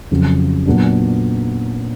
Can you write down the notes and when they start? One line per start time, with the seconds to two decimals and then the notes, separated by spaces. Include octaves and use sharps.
0.11 F2 C#3 F#3
0.66 A#2 F#3 B3 D4